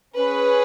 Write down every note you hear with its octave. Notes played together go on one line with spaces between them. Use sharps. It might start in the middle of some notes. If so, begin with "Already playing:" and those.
C#4 G#4 B4